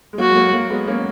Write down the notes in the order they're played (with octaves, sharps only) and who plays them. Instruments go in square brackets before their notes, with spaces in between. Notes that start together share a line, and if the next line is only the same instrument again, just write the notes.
[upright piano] G#3
[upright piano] F#3 A#3 [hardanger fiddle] F#4
[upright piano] G#3
F#3 A#3
F#3 A#3
G#3 B3
A#3 C#4